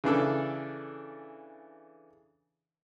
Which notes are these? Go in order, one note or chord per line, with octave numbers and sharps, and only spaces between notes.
C#3 E3 D4 A4